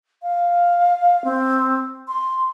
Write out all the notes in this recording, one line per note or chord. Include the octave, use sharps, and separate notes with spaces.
F5
C4
C6